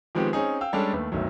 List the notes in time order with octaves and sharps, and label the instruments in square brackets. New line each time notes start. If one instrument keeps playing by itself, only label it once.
[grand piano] D#3 F3 G#3 B3 C4 G4
C4 C#4 D#4 G#4
F5 G5 E6
G3 G#3 C#4 D4 A4
D#2 A3 B4
G1 D2 D#3 F#3